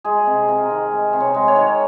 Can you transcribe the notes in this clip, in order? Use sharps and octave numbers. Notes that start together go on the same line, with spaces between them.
G#3 G#4
C3
C3 A#4
D#3
G#3
C3
C#5
G#3
C#5
D#3